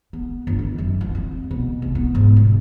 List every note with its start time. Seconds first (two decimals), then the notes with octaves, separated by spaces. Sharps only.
0.13 B3
0.47 G1
0.59 D#3
0.78 F#2
1.01 E3
1.15 C4
1.51 B2
1.82 C2
1.95 B3
2.15 G#2
2.36 B2